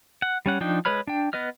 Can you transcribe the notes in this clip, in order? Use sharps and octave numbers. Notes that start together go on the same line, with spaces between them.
F#5
G3 C#4 F#5
F3 D4 D#4 G5
G#3 B4 C#5 B5 F6
D4 G5
B3 B4 D#5 F6